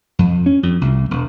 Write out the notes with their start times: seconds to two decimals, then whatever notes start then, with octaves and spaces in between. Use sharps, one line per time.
0.19 F2
0.46 C#4
0.63 F2
0.81 C2
1.11 E1